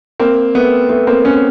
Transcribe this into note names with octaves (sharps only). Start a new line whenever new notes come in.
A#3 C4
A3 B3
A3 B3
A#3 C4
B3 C#4